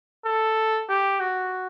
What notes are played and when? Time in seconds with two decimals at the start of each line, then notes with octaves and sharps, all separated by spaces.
0.25 A4
0.89 G4
1.20 F#4